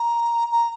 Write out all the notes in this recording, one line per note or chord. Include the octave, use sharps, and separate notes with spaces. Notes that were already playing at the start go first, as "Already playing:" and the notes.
Already playing: A#5
A#5